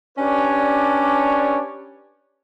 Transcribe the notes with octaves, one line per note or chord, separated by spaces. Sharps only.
C#4 D4 G4 B4 C#5 D5